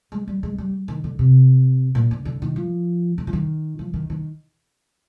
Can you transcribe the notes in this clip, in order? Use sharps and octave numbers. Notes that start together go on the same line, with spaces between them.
G#3
G3
G#3
G3
D#3
D3
C3
A#2
D3
D3
D#3
F3
D3
F3
D#3
F3
D#3
D#3